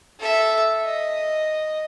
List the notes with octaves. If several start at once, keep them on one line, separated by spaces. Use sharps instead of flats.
A4 E5
D#5